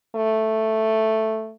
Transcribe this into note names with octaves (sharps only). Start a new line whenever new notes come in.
A3